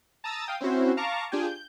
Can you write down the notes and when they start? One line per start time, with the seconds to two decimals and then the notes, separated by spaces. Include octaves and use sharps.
0.24 A5 A#5 D#6 E6 A6
0.47 F5 G5 D#6
0.61 C4 C#4 E4 F#4 C5
0.97 F5 A5 A#5 C#6 D6
1.32 D4 F4 G4 G#4 G5 G#5
1.47 G6